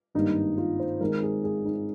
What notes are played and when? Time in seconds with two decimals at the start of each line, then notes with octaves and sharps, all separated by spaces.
0.14 G#1 G2 G3 A#3 D#4
0.58 F4
0.80 C5
1.01 G#1 G#2 D#3 G#3 A#4
1.23 G#4
1.44 G#4
1.65 D#4